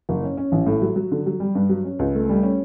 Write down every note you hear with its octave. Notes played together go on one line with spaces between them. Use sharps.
F#1
C#4
C#4
A1
A2
F#3
F#3
D3
F#3
G3
G2
F#3
C#4
C#2
A3
G3
C#4